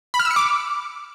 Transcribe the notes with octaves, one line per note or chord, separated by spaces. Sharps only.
B5
F6
E6
C#7
D6